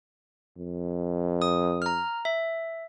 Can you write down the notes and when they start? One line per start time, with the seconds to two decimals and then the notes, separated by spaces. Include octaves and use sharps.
0.57 F2
1.42 D#6
1.82 A#5 F6
2.25 E5